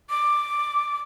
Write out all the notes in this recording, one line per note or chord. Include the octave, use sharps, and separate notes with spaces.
D6